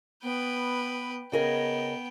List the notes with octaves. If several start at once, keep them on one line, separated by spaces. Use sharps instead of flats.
B3 B4 G5
C#3 B3 G#4 A#4 D#5 G5